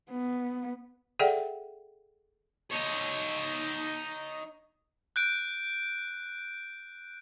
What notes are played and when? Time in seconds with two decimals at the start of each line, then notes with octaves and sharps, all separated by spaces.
0.10 B3
1.19 G#4 A4 D5 E5 F#5 G5
2.71 D#4 C#5
5.16 F#6 G6 D7